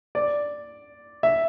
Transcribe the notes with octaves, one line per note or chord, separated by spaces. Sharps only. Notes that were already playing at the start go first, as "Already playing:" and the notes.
D5
E5